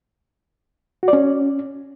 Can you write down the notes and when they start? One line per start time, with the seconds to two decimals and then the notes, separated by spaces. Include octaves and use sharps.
1.03 F#4
1.08 D5
1.13 C#4